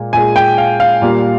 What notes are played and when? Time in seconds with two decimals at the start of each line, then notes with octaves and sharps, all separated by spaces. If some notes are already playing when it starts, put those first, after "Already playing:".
Already playing: A#2 G#3
0.13 A#2 G#3 G#5
0.36 G5
0.58 F5
0.80 F5
1.02 A#2 G3 A#3